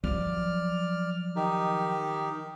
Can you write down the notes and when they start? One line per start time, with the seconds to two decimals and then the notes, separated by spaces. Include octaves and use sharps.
0.04 F3 F#3 D5 F6
1.36 D#3 D#4 G4